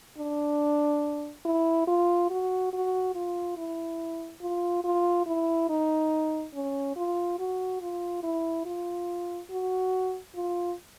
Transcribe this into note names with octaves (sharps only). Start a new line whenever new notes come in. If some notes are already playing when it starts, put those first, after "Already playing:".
D4
E4
F4
F#4
F#4
F4
E4
F4
F4
E4
D#4
C#4
F4
F#4
F4
E4
F4
F#4
F4